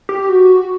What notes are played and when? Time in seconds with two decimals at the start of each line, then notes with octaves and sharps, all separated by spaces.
0.09 G4
0.29 F#4